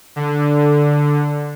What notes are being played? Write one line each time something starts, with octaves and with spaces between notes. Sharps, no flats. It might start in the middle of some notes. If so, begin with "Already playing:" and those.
D3